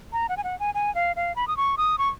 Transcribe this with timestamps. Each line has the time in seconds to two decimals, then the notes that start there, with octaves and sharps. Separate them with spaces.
0.13 A#5
0.29 F#5
0.37 G#5
0.44 F#5
0.60 G#5
0.75 G#5
0.95 F5
1.16 F5
1.36 B5
1.48 D#6
1.57 C#6
1.78 D#6
1.98 C#6